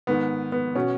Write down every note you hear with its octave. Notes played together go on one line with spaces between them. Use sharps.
G#2 D#3 B3
B3
B2 C#4